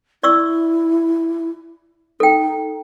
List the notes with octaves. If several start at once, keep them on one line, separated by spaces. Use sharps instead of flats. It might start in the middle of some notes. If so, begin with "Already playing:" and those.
E4 D5 C#6 E6
D#4 A4 G5